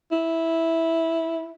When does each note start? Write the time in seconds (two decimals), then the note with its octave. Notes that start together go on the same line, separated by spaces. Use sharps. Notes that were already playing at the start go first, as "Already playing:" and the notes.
0.12 E4